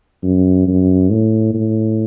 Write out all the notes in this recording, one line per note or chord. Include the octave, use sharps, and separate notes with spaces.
F#2
F#2
A2
A2